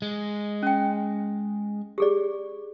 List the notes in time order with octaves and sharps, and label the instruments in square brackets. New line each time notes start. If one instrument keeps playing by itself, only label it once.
[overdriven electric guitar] G#3
[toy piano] C#4 G5
G4 G#4 D5